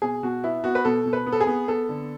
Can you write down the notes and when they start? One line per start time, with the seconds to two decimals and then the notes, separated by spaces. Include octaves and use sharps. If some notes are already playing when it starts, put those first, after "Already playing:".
0.02 B2 G#4
0.23 B2 F#4
0.43 B3 E4
0.64 B3 F#4
0.75 B4
0.85 B2 A4
1.06 B2
1.13 B4
1.26 B3
1.32 A4
1.41 G#4
1.47 B3
1.68 B3 A4
1.89 D3